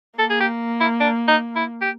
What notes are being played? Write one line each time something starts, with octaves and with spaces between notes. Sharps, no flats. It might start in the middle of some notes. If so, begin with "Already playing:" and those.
A#3 A4
G#4
G4
E4
D4
D#4
E4
G4